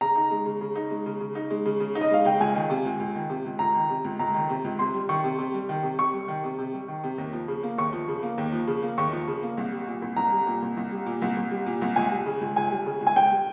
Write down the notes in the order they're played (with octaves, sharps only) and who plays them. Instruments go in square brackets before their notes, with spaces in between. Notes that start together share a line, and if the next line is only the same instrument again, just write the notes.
[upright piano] C#3 [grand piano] A#5
[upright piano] D#4
G#3
C#3
C#3
D#4
G#3
C#3
C#3
D#4
G#3
C#3
C#3
D#4
[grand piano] D#5
[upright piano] G#3 [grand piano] F5
[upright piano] C#3 [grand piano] G5
[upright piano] C#2 [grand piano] G#5
[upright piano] D#3
C3
C#2
C#2
D#3
C3
C#2
[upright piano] C#2 [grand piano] A#5
[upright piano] D#3
C3
C#2
[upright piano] C#2 [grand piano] A#5
[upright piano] D#3
C3
C#2
[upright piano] C3 [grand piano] C6
[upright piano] G3
[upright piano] D#3 [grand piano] C#6
[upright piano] C3
C3
G3
D#3
C3
[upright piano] C3 [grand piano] C#6
[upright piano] G3
D#3
C3
C3
G3
D#3
C3
D#2
F3
C#3
A#3
[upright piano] D#2 [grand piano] C#6
[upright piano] F3
C#3
A#3
D#2
F3
C#3
A#3
[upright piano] D#2 [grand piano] C#6
[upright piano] F3
C#3
A#3
C2
G3
A#2
C2
[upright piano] C2 [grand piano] A#5
[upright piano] G3
A#2
C2
C2
G3
A#2
C2
C2
G3
A#2
C2
[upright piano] C#2 [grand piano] G#5
[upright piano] G3
C#3
C#2
[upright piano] C#2 [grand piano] G#5
[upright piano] G3
C#3
C#2
[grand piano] G#5
[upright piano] C#2 [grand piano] G5
[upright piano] G3